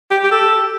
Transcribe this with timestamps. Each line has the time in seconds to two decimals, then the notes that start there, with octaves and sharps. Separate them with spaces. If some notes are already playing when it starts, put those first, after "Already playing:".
0.10 G4
0.23 G4
0.32 A4